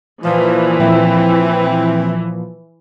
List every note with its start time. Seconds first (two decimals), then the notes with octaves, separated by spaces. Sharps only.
0.25 A#2 E3 F3
0.79 A#2 F3 C4 E4